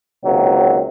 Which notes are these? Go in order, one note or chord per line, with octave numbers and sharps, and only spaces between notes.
C#2 C3 D#3 F#3 A#3